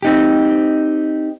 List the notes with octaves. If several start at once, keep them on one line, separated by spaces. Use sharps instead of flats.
C4 D#4 G4